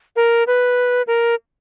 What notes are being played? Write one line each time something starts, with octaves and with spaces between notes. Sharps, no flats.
A#4
B4
A#4